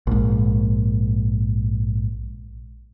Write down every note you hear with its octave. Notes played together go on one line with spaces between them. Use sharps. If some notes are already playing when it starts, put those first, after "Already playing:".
A#1 G#2